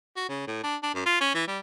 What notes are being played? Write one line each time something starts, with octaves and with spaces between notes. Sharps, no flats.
F#4
C#3
A2
D4
D4
F#2
F4
C#4
E3
G3